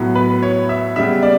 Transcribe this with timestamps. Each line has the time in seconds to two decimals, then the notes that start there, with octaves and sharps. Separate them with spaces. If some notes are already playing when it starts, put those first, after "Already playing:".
Already playing: A2 F#3 B3
0.15 B4
0.42 C#5
0.69 E5
0.96 C#3 G3 B3 E5
1.23 D5